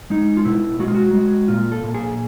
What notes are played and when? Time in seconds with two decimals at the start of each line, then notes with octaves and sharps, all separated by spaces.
0.10 G#3 D#4
0.37 F4
0.45 B2 E4
0.79 G#3 F#4
0.88 F4
0.95 F#4
1.13 G#3
1.48 A#2 F4
1.72 A4
1.83 A#2
1.94 G#4